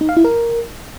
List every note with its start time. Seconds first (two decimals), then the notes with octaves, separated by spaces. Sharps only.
0.01 D#4
0.09 F5
0.17 E4
0.25 A#4